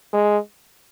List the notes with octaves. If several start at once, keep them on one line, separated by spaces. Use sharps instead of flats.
G#3